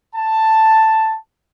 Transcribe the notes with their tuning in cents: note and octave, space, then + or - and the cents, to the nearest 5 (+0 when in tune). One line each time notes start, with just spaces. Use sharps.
A5 +5